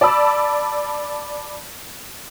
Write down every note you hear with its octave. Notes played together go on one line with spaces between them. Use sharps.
D5 A5 B5 E6